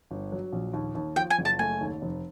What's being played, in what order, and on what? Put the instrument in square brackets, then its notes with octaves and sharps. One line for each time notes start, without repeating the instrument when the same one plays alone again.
[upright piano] G1
F#3
A#1
D#2
D#2
[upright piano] F3 [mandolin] G5
[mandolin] G#5
[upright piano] F#1
[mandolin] A5
[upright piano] A3 [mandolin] G#5
[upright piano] D#2
F1